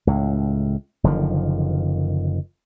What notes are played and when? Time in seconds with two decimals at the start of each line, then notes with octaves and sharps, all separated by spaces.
0.07 C#2 A2
1.04 F#1 D3 D#3 F3